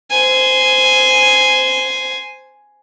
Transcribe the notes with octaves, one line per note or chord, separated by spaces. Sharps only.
C5 G#5